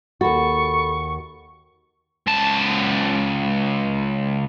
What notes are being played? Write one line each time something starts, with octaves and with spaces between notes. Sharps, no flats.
D#2 F#4 A4 B5 C#6
C#2 A5